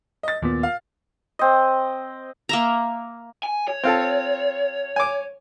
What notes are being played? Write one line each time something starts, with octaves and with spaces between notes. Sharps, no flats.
D#5 A6
D#2 A#2 B3
F5
C4 D#5
A#3 E5 A#5
G#5
C#5
C4 F4 A4
G#5 D6